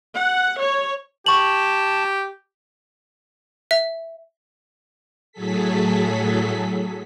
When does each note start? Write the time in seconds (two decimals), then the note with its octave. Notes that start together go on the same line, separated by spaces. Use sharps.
0.15 F#5
0.60 C#5
1.26 G4 A5 C#6 F#7
3.71 E5
5.32 A2 F#3 G#4 A4 B6